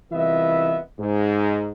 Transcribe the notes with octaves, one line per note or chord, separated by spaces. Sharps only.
C2 E3 B3 F4 D#5 E5
G#2